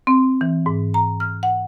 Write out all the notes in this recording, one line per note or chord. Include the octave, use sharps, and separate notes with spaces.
C4
E3
G#2
A#5
F6
F#5